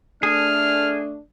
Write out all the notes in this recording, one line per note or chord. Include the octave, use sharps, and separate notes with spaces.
A3 D4 G#4 F6